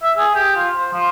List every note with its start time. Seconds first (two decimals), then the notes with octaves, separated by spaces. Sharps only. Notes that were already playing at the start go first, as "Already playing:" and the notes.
0.02 E5
0.17 G#4
0.35 G4
0.56 F4
0.76 C5
0.93 F3